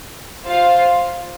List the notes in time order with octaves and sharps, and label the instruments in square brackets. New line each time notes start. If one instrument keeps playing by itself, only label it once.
[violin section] F4 C5 F5